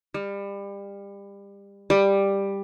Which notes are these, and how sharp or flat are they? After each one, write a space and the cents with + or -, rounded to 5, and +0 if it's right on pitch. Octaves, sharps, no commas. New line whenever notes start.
G3 +30
G3 +10